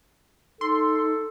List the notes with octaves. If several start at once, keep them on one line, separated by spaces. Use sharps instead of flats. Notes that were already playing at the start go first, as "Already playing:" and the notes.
D#4 A4 C6